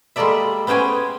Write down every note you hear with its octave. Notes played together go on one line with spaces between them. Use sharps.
G3 G#3 A#3 A4 D5 E5
B3 C#4 C5 G5 G#5